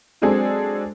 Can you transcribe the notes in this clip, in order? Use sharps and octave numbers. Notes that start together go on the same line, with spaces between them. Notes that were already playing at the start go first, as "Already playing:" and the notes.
F#3 G#3 C4 D4 G#4 A4